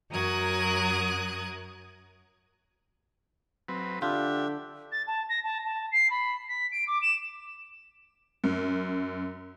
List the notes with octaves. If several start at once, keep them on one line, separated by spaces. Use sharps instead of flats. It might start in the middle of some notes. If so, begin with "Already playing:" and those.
F#2 F#3 A#4 D#6 F#6 G#6
F#3 C4 B4
D3 D4 F4 G4 E5
A6
A5
A#6
A5
A5
C7
B5
B6
D7
D6
E7
F#2